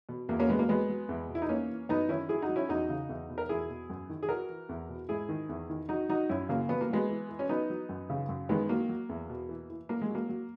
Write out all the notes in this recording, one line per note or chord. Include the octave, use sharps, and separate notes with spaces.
B2
E2 A#3
A#3 C#4
B2 G#3 B3
A#3
F#3 G#3 B3
F#3
E2
B2
E4
D#4
E3 A#3 C#4
E3
F#2 B3 D#4
D#3 C#4 E4
F#3 E4 G#4
D#4 F#4
F#3
C#4 E4
E2 D#4 F#4
C#3
E2
B2
A#4
E2 E4 G#4
B2
F#2
D#3
G#4
E3 F#4 A#4
E3
E2
B2
G#2 E4 G#4
D#3
E2
D#3
F#3 D#4 F#4
F#3 D#4 F#4
F#2 C#4 E4
C#3 A#3
F#3 B3
A#3
F#3 G#3 B3
E3
E3
C#4
F#3 B3 D#4
F#3
F#2
C#3
F#2
D#3 G#3 B3
F#3 A#3
F#3
E2
B2
E3
E3
F#3 A#3
G#3
F#3
A#3
F#3